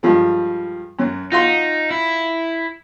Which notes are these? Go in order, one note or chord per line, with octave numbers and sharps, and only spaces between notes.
G2 F3 G#3
F#2 F#3
D#4 F4 F#4 C6
E4